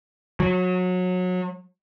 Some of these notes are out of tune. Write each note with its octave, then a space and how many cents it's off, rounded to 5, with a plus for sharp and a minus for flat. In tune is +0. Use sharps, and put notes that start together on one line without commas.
F#3 -25